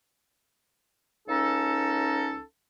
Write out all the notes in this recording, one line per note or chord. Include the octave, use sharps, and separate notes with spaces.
C#2 C#4 D#4 A4